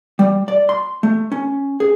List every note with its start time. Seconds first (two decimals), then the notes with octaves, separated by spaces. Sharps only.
0.19 G3
0.48 D5
0.69 C6
1.03 A3
1.32 C#4
1.80 G#4